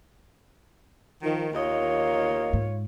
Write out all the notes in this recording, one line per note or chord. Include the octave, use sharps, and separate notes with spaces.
D#3 F3
D#2 A#3 F4 C#5 D#5
G#2